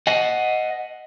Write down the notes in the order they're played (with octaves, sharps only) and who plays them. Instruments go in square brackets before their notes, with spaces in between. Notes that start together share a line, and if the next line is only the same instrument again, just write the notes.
[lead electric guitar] D#5 F#5